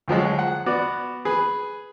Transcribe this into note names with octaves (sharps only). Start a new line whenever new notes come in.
D2 F3 F#3 G#3
F#5
B3 F#4 D5
G#4 B4